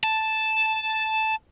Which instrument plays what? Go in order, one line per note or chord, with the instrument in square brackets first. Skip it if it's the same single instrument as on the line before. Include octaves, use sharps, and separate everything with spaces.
[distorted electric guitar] A5